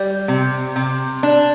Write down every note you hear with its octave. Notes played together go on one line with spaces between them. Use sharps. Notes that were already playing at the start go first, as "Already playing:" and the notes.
Already playing: G3
C3
C3
D4